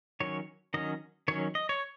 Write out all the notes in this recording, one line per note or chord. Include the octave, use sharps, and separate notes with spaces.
D#3 F#3 C#4 C#5
D#3 F#3 C#4 D#5
D#3 F#3 C#4 C#5
D#5
C#5